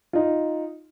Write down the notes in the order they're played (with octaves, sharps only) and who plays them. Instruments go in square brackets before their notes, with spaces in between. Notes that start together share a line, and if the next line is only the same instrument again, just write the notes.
[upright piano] D#4 F4